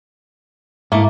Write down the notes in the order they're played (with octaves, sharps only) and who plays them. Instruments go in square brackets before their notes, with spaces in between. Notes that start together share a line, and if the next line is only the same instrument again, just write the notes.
[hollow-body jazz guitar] G#2 E4 [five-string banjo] A3 A#3